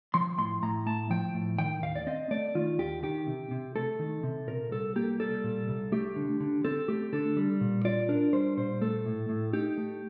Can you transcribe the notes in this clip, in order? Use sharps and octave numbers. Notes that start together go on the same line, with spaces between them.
F3 C6
A2 C6
A2 A#5
A3 A5
F3 G5
A2
D#3 G5
D#2 F5
D5
C4 D#5
A3 D5
D#3 F4
D#2 G4
D#3 G4
C3
C3
A3 A4
D#3
C3
A#2 A#4
C2 A4
A#3 G4
G3 A4
A#2
C2
A3 G4
D3
D3
C4 A4
A3 G4
D3 A4
G3
A#2
F4 D5
D4 A#4
G3 C5
A#2 C5
A3 A4
A2
A2
D#4 G4
A3